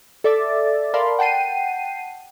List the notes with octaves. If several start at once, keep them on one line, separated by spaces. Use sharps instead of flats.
A4 D5 E5 D6 A6
A#4 D5 F5 A5 B5 C6
F#5 G5 A5 C7 D#7